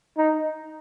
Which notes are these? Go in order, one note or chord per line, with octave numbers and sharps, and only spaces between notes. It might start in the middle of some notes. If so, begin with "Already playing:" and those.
D#4